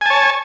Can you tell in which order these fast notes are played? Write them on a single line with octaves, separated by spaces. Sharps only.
G#5 A5 C#5